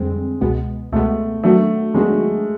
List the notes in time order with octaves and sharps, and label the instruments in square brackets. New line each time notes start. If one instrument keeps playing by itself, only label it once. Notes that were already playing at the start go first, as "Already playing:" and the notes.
Already playing: [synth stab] F2 D3 G3 C4 [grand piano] G#3
[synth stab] C#2 B2 G#3 B3
[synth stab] C#2 B2 G#3 B3 [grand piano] A3
[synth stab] D#3 F#3 B3 D4 F#4 [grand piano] A3
[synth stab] D#3 F#3 B3 D4 F#4 [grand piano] G#3